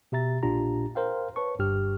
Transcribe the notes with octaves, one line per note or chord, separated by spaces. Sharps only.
B2 G4 E5 A#5 A6
A#1 A#2 D4 F4 G4 A#5
A#4 C5 F5 G5
B4 C#5 A5 C#6
G1 G2 G4 F6